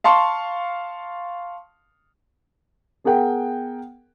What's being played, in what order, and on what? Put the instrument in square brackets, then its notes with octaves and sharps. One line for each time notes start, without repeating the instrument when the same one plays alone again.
[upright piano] F5 A5 C6 C#6
[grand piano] B3 G#4 A#4 F#5 G5